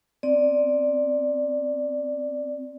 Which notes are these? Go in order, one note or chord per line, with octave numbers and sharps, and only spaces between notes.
C4 D5